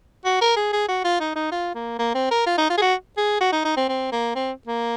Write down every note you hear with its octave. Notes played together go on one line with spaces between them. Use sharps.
F#4
A#4
G#4
G#4
F#4
F4
D#4
D#4
F4
A#3
A#3
C4
A#4
F4
D#4
F4
G#4
F#4
G#4
F#4
D#4
D#4
C4
C4
A#3
C4
A#3